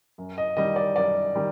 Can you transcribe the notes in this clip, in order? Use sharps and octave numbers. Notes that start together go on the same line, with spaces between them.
F#2
D#5
D#3 G3 D#5
D5
F#2 D5
D#3 G3